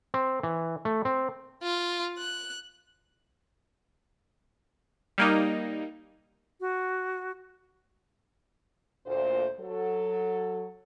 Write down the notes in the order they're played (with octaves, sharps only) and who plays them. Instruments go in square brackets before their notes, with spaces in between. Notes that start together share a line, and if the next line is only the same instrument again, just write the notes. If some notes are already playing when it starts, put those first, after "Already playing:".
[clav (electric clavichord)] C4
E3
A3
C4
[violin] F4
F#6
[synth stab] G3 A#3 D#4
[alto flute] F#4
[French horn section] D2 A#2 C5
F#3 A4